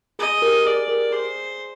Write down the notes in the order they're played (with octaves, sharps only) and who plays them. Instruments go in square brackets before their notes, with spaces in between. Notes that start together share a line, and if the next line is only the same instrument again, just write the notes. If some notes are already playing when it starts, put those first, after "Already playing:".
[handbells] G#4 [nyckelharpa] D#5
[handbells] G4 A#4
[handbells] G#4 [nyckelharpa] D5
[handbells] G4 A#4
[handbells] G#4 [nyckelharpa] C5